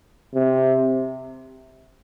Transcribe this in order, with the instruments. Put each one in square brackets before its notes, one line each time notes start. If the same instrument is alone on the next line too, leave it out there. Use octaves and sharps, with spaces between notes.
[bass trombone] C3